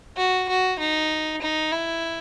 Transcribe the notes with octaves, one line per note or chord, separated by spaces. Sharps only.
F#4
F#4
D#4
D#4
E4